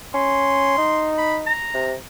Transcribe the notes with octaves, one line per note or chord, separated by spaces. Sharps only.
C#4 C6
D#4
B5
A#5
C3